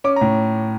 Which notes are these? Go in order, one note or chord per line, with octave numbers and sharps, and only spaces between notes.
C#4 D6
A#5
A2